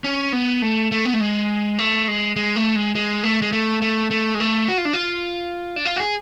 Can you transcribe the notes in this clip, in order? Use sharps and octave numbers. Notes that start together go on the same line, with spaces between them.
C#4
B3
A3
A3
B3
A3
G#3
A3
G#3
G#3
A3
G#3
G#3
A3
G#3
A3
A3
A3
G#3
A3
F#4
F4
D4
F4
D4
F4
F#4
G#4